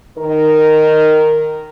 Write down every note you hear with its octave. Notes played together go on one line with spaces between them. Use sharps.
D#3 A#4